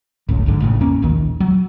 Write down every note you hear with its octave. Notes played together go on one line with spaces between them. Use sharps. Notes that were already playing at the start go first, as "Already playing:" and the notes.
F#1 C#2 A2
A#1 G#2 D3
A1 A2 C#3
E2 A#3 C#4
E1 A#1 D#2 D#3
F#3